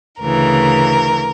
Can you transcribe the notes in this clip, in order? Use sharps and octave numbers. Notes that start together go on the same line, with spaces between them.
D2 C#3 E3 A#4